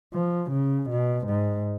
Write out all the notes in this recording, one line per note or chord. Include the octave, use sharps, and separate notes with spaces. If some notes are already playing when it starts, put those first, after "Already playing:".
F3
C#3
B2
G#2